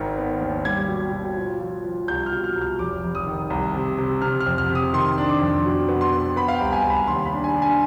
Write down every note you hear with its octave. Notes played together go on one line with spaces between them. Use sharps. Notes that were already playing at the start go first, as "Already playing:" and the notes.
Already playing: G#1 D#3
B3
D#2
G3 G#6
B2
B2
F3
F3
F3
C2 G6
F6
B2
F6
C2
F6
F1 D6
F1
D#6
D#3
C2
C3
C3
C3 F6
F6
F2
F6
C3
D#6
D#3 C6
D4
D6
F2
B2
B3
C6
B3
B3 B5
F5
G5
C2
G#5
C2
B5
D#2 C6
B5
D4
G#5
D4
G#5